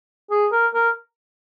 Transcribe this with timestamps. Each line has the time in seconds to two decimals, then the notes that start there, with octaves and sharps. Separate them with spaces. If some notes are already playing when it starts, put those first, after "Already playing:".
0.30 G#4
0.52 A#4
0.74 A#4